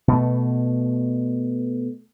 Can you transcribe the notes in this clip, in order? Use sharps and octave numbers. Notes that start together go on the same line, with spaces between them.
B2 A3